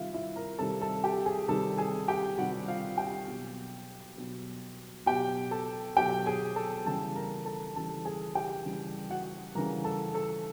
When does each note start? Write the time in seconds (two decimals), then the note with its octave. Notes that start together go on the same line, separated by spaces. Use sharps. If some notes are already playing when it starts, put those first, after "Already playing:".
Already playing: C3 D#3 G3 F4 E5 F5
0.14 E4 E5
0.36 A#4 A#5
0.59 C3 D#3 G3 A4 A5
0.81 A4 A5
1.04 G4 G5
1.26 G#4 G#5
1.48 C3 D#3 G3 A4 A5
1.78 G#4 G#5
2.08 G4 G5
2.38 C3 D#3 G3 F#4 F#5
2.68 F4 F5
2.97 G4 G5
3.27 B2 F#3
4.17 B2 F#3
5.06 B2 F#3 G4 G5
5.51 A4 A5
5.97 B2 F#3 G4 G5
6.26 G#4 G#5
6.56 A4 A5
6.86 C#3 E3 G3 A4 A5
7.16 A#4 A#5
7.45 A4 A5
7.76 C#3 E3 G3 A4 A5
8.05 G#4 G#5
8.35 G4 G5
8.65 C#3 E3 G3
9.10 F#4 F#5
9.55 C#3 E3 G3 A#4 A#5
9.84 A4 A5
10.14 A4 A5